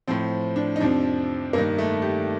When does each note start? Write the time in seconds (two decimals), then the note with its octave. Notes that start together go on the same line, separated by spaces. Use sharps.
0.07 A2 F3 C4
0.56 D4
0.76 D#4
0.80 F2 C3 F3 D4
1.53 G2 D#3 A#3
1.78 A3
2.02 G4